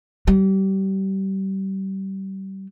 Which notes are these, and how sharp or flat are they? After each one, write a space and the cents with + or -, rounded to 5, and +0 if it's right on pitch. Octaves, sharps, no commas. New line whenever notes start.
G3 -30